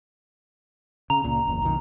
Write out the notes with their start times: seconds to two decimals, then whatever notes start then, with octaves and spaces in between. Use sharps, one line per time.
1.10 C#3 A#5
1.24 C#2 A#2
1.47 F#1 E2
1.62 B1 F2 D#3